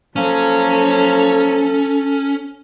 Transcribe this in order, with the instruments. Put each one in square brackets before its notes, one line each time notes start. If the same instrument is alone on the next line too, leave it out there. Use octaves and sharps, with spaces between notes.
[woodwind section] F3 F#3 A#3 [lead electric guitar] C#4 [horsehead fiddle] A4